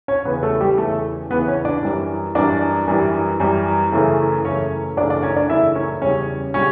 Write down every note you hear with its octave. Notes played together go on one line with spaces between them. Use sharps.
C#4 C#5
E2 C#3 E3 B3 B4
A3 A4
G3 G4
E2 C#3 E3 A3 A4
E2 C#3 E3 B3 B4
C#4 C#5
D4 D5
F#2 E3 G3
F#2 E3 G3 D4 D5
F#2 E3 G3
F#2 E3 G3
F#2 C#3 E3 A3
F#2 C#3 E3 A3 C#4 C#5
F#2 C#3 E3 A3 D4 D5
D4 D5
C#4 C#5
D4 D5
F#2 C#3 E3 A3 E4 E5
C#4 C#5
E2 C#3 G3 C#4 C#5
C#3 G3 C#4 C#5